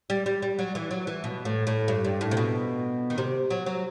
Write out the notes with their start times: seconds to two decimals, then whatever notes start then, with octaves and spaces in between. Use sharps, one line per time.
0.10 G3
0.26 G3
0.42 G3
0.59 F#3
0.75 E3
0.91 F#3
1.07 E3
1.24 B2
1.45 A2
1.67 A2
1.88 G2
2.05 G2
2.21 A2
2.31 C3
2.37 B2
3.10 D#3
3.18 C3
3.51 F#3
3.66 F#3